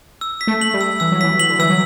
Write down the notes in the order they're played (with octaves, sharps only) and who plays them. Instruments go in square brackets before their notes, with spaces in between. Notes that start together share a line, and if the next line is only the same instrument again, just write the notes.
[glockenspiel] E6
B6
[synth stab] A3
[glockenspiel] F#7
[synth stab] G3
[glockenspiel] E6
[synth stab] E3 [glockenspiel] E6
[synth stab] F#3
[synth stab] E3 [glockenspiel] B6
[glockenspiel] F#7
[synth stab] D3
[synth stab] E3 [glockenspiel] E6
[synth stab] F#3